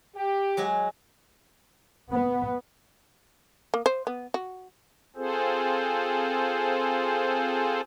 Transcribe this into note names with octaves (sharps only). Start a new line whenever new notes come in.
G4
F#3 G#3 F#4
B3
A#3
C5
B3
F#4
C4 F4 G#4 A4 C5